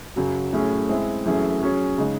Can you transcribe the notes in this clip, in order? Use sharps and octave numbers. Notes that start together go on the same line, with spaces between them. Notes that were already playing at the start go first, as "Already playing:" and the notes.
F#2 C#3 F#3
A2 F#3 A3 C#4 G#4
G#3 C4 E4 G#4
F#2 E3 A3 C#4 G#4
F#3 C#4 G#4 C#5
C#3 G#3 D#4